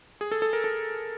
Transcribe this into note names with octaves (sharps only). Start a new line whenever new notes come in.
G#4
A4
A4
A#4
A4